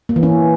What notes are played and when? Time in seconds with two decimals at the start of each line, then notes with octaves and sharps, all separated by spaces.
0.09 A#3
0.16 E3
0.23 C#4